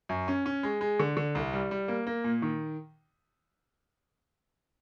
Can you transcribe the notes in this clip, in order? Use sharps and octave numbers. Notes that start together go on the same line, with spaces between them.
F#2
C#4
C#4
G#3
G#3
D3
D3
C2
G3
G3
A#3
A#3
A#2
D#3